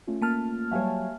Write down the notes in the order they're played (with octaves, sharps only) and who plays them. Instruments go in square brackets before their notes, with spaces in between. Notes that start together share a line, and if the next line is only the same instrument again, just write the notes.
[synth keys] A3 C#4 F4
[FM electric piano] A#3 A5 F6
[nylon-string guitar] F#3 G3 C#5 [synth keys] E5 F5 G#5